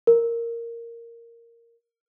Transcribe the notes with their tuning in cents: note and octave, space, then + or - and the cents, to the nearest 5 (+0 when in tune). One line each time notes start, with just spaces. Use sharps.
A#4 -5